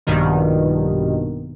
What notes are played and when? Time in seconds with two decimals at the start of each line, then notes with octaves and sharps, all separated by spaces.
0.07 A#1 G2 B2 D#3